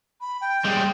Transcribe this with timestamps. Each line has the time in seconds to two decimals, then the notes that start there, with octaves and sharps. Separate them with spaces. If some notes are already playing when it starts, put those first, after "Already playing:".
0.20 B5
0.41 G5
0.64 G3 G#3